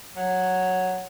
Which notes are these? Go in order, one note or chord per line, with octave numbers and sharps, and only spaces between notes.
F#3